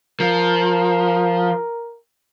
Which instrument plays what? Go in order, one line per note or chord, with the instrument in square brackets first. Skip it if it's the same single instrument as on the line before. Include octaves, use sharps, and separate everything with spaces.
[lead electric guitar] F3 [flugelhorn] A#4